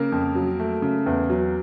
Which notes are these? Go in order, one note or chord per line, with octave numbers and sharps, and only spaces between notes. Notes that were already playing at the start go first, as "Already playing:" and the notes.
Already playing: C#3 A#3 A#4
F2
F#3
A3
C#3
E2
F#3